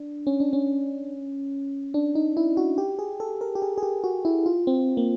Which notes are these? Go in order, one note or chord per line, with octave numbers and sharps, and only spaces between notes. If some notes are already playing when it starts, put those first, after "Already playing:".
Already playing: D4
C#4
D4
C#4
D4
D#4
E4
F#4
G4
G#4
A4
A#4
G4
G#4
G#4
G4
F#4
E4
F4
C4
A#3